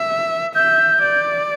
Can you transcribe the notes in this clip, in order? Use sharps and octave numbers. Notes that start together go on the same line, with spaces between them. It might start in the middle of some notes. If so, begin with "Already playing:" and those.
Already playing: E5
E5 G6
D5